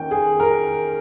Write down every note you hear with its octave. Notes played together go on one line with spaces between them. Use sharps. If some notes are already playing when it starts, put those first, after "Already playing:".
Already playing: D#3 A#3 C#4 G5
G#4
A#4